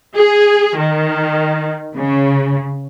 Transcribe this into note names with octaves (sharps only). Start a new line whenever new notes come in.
G#4
D#3
C#3